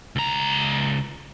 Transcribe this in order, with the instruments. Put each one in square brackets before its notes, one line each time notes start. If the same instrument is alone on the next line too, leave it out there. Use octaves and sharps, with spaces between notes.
[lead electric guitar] C#2 A#5